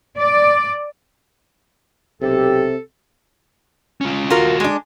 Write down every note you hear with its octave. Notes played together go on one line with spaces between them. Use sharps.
D5
B1 C3 G4 A4
C#4 F4
D#2 F4 F#4 A#4
G#3 D4